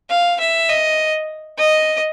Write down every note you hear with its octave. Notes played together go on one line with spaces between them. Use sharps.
F5
E5
D#5
D#5